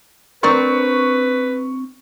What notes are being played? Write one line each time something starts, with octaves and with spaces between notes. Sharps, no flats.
C4 D4 A#4 B4 C#6